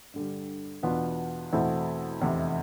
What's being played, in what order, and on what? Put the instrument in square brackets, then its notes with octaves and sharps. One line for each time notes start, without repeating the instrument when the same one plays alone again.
[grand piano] G2 D3 G3
E2 B2 B3 D4 F4
E2 B2 A3 C4 E4
F1 E2 C3